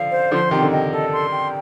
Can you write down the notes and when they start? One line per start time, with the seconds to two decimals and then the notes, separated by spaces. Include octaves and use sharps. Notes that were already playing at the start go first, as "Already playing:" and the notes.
Already playing: D3 F3 F5
0.11 C5
0.31 D3 F3 C6
0.51 C3 D#3 G5
0.62 D3
0.72 C3 D#5
0.92 A4
1.13 C6
1.33 G5